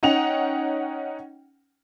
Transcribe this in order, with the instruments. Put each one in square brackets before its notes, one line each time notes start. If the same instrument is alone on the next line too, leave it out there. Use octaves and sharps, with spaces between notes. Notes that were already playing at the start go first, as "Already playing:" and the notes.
[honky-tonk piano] C#4 D#4 F#5 G5 F7